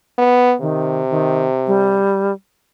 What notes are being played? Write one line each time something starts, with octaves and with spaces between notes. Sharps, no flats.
B3
C3 D#3
D#3
G3